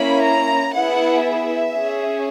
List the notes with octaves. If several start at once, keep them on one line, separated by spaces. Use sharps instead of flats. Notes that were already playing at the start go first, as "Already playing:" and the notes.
Already playing: A#3 C#4 E4 B5
A#5
B3 E4 G#4 F#5
E5
C#4 G#4